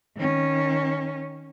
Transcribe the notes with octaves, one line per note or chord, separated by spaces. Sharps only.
D#3 C#4